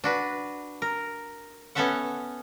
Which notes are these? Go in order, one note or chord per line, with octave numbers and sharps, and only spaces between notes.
D4 F#4 B4
A#4
B3 C#4 A4 C#5 E5 F#5